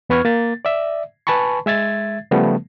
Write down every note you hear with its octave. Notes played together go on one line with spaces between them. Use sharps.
E2 B3 B4 C#6 F6 G#6
A#3 A6
D5 E5
B4 G#5 A5 B5 C#6
G#3 E5 G#6 A6
C#3 F3 G3 A3 B3